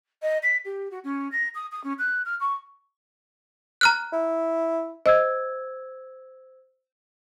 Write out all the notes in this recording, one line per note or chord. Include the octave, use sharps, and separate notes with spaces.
D#5
B6
G4
F#4
C#4
A#6
D#6
D#6
C#4
F#6
F6
C#6
A#5 F6 F#6
E4
C5 D#5 E6 G#6